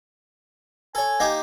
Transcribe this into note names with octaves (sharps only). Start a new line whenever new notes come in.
A4 C#5 G#5
A#3 D#4 G4